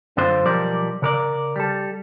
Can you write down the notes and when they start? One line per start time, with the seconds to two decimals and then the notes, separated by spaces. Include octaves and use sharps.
0.17 F#2 D3 D4 F4 C5 C6
0.46 B1 F3 G3 A#4 D5
1.02 C#3 A#4 D5
1.56 G3 A4